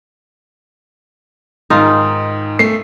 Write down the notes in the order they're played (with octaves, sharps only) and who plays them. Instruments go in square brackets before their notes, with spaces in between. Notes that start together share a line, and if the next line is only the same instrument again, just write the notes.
[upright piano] G#2 D#3 [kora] D#4 F4
[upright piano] A3 C7